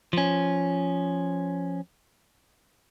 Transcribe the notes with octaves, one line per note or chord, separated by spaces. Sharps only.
F3 C#4